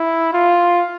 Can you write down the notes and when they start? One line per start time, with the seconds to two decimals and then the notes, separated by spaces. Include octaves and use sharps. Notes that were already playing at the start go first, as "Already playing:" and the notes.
Already playing: E4
0.33 F4